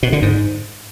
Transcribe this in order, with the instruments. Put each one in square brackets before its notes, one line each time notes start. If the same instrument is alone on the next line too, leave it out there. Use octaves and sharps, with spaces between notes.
[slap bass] B2
D3
G#2